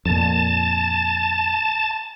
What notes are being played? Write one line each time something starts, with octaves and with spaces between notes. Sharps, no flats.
F2 A#2 A5